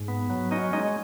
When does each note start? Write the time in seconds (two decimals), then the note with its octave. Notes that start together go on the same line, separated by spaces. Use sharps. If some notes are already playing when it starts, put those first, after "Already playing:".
Already playing: G#2
0.08 B3
0.30 F#3
0.51 C#4 D#4 D#5
0.73 G#3 D#4 D#5